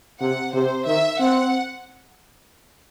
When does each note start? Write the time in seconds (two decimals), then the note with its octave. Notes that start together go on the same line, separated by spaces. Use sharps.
0.21 C3 F#5
0.54 C3 C5
0.86 D#3 E5
1.20 C4 F#5